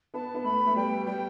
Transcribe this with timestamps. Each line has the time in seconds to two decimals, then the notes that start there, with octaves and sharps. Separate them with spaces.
0.14 B3 A5
0.34 B3
0.44 A3 B5
0.66 A3
0.76 G3 G5
1.06 G3 G5